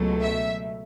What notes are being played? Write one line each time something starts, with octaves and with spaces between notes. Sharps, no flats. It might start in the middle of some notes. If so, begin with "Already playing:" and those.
Already playing: C#2 B2 F#3 A3
E5